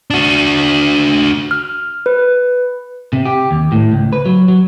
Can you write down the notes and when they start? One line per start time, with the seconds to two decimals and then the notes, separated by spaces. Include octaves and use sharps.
0.10 D4 F#4
1.51 F6
2.06 B4
3.13 C3
3.25 G4
3.51 D#2
3.72 A2
3.92 C#2
4.13 B4
4.26 F#3
4.48 F#3